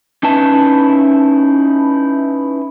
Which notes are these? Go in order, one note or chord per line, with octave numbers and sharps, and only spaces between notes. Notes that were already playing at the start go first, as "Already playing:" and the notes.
C#4 D#4 E4 B4 A5